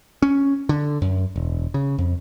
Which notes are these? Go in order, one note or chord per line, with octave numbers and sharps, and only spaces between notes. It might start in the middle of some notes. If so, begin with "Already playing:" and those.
C#4
D3
F#2
E1
C#3
F2